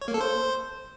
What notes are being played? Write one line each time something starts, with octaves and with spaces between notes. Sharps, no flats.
C#5
A#3
A4
C5